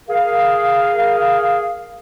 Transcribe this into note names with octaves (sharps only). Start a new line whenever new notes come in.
G#4 A#4 F5